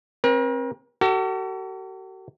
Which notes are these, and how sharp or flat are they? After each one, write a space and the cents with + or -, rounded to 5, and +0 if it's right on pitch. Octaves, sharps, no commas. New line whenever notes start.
C4 +30 A#4 +45
F#4 +45 A4 +40